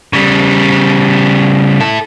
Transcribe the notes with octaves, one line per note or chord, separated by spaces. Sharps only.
C#3 G3
E4 A4